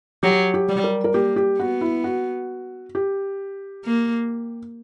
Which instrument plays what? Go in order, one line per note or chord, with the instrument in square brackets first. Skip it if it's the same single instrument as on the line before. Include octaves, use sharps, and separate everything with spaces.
[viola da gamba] F#3 [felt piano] G4
[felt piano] G4
[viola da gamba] G3
[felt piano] A#4
A#4
[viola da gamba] A#3 [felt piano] G4
[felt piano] G4
[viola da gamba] B3 [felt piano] F#4
[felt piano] E4
F#4
G4
[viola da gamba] A#3